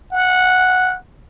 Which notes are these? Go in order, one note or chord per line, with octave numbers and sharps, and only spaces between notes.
F#5